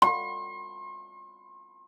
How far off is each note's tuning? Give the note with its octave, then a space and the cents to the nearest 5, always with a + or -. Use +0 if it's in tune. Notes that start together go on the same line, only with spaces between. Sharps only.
C6 +45